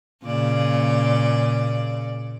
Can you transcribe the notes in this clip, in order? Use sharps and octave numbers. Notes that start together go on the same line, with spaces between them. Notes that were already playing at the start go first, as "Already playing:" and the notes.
A#2 C#3 D5